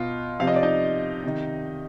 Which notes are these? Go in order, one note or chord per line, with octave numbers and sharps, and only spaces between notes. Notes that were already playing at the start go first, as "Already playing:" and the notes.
Already playing: B2 F4
C3 F3 F5
D#5
D5
D#4 D#5
C3 D#3